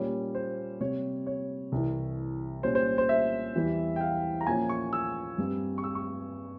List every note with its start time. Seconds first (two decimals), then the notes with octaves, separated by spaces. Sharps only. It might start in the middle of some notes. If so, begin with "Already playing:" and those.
Already playing: A#2 G3 A#3 C#4
0.35 C5
0.80 C3 G3 C4 C#5
1.27 C#5
1.72 C2 C3 E3
2.63 A#2 G3 C#4 C5
2.75 C5
2.98 C5
3.09 E5
3.55 E2 E3 G3
3.96 G5
4.01 F5
4.41 A#5
4.47 A#2 F3 A#3 C#4 G#5
4.69 C#6
4.93 E6
5.38 G2 G3 C4
5.78 C#6
5.84 E6
5.95 C#6